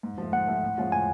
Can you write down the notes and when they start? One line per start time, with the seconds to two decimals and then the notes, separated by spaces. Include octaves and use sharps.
0.03 G#2
0.18 F3 A3
0.32 G#2 F#5
0.47 F3 A3
0.63 A2
0.78 F3 G#3 C#4 F4
0.92 A2 G#5